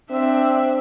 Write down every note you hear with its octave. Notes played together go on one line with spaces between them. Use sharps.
C4 D4 E5